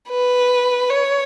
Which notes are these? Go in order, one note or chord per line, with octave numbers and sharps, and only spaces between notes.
B4
C#5